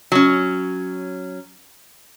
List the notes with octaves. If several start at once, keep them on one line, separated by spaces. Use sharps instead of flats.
F#3 C#4